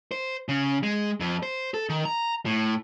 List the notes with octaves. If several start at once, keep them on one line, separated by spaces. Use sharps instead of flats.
C5
C#3
G#3
F2
C5
A4
D#3
A#5
A2